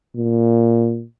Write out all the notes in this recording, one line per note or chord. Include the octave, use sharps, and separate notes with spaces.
A#2